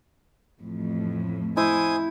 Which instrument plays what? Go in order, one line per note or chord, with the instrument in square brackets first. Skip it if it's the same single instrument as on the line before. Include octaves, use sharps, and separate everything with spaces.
[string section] A1 F2 A2
[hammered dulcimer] E4 [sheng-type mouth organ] C5 G#5 D#6